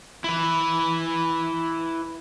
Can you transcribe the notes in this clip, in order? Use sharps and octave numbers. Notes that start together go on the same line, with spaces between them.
E4 B4